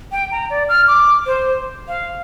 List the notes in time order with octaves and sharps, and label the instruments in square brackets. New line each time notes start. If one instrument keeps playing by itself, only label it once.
[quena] G5
A#5
D5
F6
D6
C5
F5